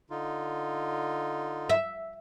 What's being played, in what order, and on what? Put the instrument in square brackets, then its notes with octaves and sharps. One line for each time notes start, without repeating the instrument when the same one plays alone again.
[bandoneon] D3 D#4 F4
[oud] E5